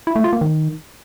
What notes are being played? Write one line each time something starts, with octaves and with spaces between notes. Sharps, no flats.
E4
A3
F4
A#3
D#3